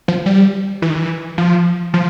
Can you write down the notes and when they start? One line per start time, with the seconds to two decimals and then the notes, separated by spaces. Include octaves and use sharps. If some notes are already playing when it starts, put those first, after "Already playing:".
0.08 F3
0.26 G3
0.82 E3
0.90 D#3
0.96 E3
1.38 F3
1.94 F3